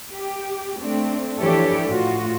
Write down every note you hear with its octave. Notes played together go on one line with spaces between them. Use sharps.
G4
A3 C4 D4
E3 F3 D4 G4 A4 C#5
A2 F4 F#4